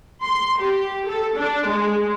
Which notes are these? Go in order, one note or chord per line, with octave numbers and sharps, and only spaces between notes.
C6
G4
A4
D4
G#3